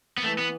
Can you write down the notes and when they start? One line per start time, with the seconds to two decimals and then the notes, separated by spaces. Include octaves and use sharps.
0.18 B3
0.23 E3 A3
0.38 B3